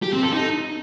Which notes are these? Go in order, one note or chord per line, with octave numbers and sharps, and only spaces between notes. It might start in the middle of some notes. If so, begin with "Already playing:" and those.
G4
C4
A4
D#4